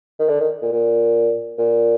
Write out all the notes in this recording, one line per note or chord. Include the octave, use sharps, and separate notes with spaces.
D#3
D3
D#3
A#2
A#2
A#2